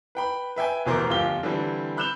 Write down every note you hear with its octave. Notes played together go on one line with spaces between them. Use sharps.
B4 G5 B5
B4 E5 G5 G#5
F1 B2 E3 A#4 C5 D6
G1 F2 F4 G4 G7
D3 E3 G3 C4 E4
B5 F#6 G6 E7 F7 G7